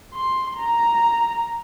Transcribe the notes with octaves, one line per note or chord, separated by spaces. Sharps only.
C6
A#5